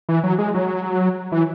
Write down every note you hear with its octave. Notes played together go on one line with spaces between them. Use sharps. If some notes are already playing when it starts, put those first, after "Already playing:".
E3
F#3
G#3
F#3
E3